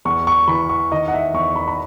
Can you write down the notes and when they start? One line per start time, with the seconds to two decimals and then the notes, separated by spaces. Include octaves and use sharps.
0.05 E2 C#6
0.27 C#6
0.48 E3 B5
0.69 C#6
0.92 D#3 D#5
1.08 F#5
1.14 E5
1.34 E2 C#6
1.56 B5
1.68 B5